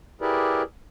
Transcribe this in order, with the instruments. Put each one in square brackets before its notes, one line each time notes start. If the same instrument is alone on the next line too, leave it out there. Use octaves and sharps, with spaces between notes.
[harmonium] E4 G4 G#4 A#4 B4 D5